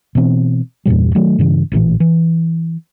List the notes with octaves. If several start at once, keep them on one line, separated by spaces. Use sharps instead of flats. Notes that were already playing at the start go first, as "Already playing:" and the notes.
B2 E3 C4
E2 G2 A#2 G3
D#3 F#3 A3
G2 C#3 E3
A1 A#2 D#3 E3
E3